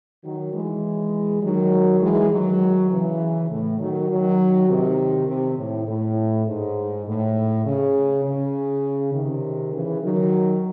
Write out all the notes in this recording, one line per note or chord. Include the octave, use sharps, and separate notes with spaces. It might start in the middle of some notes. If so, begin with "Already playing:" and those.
D#3 F#3
E3 G#3
D#3 F#3
E3 G#3
D#3 F#3
C#3 E3
A2
D#3 F#3
D#3 F#3
C3 D#3
C3
A2
A2
G#2
A2
C#3
C#3
C3 D#3
C#3 E3
D#3 F#3